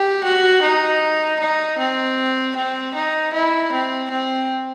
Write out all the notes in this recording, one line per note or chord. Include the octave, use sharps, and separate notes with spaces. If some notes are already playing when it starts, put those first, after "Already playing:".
Already playing: G4
F#4
D#4
D#4
C4
C4
D#4
E4
C4
C4